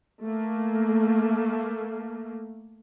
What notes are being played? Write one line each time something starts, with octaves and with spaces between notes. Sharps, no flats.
A3 A#3